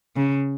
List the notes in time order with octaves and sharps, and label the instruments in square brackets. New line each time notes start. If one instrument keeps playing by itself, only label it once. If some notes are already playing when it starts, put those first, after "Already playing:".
[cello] C#3